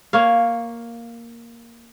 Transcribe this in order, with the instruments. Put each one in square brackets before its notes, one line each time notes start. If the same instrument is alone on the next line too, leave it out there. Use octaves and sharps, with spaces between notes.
[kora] A#3 C#5 F5